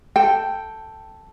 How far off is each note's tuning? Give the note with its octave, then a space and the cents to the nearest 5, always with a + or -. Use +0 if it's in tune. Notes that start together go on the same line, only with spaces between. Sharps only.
A4 +0 G5 +0